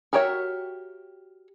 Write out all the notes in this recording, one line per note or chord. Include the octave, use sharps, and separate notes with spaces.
F#4 G4 A#4 C#5 E5